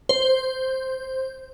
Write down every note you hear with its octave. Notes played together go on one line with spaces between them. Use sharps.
C5